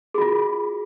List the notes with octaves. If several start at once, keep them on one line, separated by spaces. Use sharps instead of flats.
F4 F#4 G#4